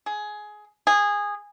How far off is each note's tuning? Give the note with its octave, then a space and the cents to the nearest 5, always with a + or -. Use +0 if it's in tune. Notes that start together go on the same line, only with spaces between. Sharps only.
G#4 +15
G#4 -15